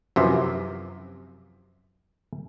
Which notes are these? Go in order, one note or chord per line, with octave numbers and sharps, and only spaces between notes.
F#2 C3 E3 F3